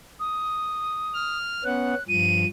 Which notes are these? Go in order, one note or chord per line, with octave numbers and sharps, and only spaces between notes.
D#6
F6
B3 C#4 F#5 F#6
G2 F3 D#7